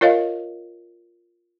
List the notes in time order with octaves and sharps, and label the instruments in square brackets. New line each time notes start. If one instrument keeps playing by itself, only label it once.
[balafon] F4 A#4 C#5 D#5 F5